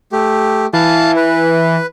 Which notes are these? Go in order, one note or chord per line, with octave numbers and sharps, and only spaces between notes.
A3 G4
E3 F5 A5
B4